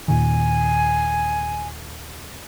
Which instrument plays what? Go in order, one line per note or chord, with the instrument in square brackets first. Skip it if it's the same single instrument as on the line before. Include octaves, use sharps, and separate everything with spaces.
[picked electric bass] D#2 A#2 D#3 [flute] G#5